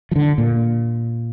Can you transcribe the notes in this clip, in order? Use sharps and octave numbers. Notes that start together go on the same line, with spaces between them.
F3
D3
A#2